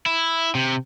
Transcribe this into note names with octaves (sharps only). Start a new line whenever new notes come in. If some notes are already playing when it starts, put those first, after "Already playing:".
E4
C3